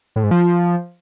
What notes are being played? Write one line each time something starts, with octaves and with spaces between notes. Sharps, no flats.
A2
G#2
F3